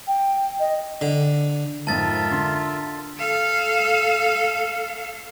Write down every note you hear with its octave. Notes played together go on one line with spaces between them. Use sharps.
G5
D#5
D3
F2 G#2 F4 A#4 E5 A5 A6
D3 C6
A4 F5